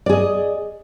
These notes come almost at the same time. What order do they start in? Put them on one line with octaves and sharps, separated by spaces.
D5 G#4 D#5